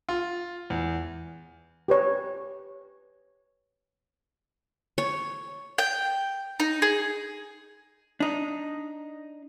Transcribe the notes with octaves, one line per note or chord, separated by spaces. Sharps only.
F4
E2
G4 B4 C#5
C#5
G5
D#4
G#4
D4 D#4